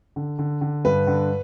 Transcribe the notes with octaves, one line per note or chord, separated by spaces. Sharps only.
D3
D3
D3
G2 B4
D3